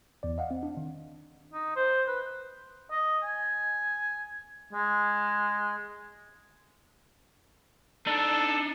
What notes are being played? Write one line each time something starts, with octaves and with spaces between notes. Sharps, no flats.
E2 D5
D#5 F5 F#5
C4
D4
D#3
D#4
C5
B4
D#5
G#5
G#3
D4 D#4 A4